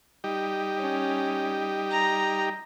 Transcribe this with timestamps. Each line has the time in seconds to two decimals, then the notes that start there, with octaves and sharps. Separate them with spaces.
0.24 G3 D#4 G4
0.79 C#4
1.91 A#5